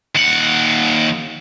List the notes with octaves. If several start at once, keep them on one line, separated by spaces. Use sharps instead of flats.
D#2 F#5